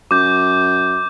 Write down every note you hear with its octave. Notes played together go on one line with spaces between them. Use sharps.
F#2 D6 G6